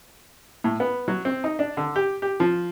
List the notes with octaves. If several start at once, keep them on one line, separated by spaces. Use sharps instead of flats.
A2
B3
F#3
C4
D#4
D4
D3
G4
G4
F3